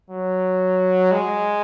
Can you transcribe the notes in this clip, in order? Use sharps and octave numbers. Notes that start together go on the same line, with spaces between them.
F#3
G#3